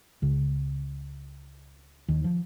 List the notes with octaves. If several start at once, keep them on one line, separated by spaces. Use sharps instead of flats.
C#2 C#3
D#2 D#3
F3